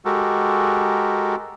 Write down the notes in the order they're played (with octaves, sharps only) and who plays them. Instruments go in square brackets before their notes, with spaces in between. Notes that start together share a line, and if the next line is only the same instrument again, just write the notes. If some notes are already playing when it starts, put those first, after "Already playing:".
[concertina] G#3 F#4 G4 A4 A#4